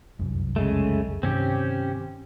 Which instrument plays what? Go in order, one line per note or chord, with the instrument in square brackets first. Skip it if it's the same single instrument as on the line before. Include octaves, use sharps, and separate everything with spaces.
[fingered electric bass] F1 C2 F#2
[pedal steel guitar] C#3 G#3 A3
[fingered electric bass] G2 C3 D#3 [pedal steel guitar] C4 C#4 G4